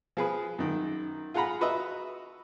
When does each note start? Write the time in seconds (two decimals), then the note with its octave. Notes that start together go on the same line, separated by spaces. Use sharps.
0.17 F3 G#4 B4
0.59 F#2 D#3
1.34 F4 G#4 F#5 A#5 B5
1.61 F#4 B4 D#5 E5